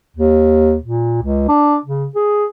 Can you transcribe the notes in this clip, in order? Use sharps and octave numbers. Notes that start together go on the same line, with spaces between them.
D#2
A#2
C#2
D4
C#3
G#4